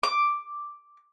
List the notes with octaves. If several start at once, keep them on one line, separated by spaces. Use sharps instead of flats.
D6